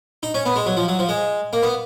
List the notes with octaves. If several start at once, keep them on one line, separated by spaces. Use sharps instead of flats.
D#4
C#4
B3
G#3
F#3
F3
F#3
F3
G#3
A#3
B3